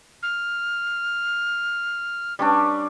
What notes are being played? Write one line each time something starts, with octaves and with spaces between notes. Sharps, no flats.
F6
G3 C#4 D4